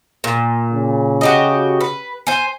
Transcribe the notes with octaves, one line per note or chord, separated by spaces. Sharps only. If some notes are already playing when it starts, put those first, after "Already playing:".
A#2
C#3
F#4 G4 D#5
B4
C5 G#5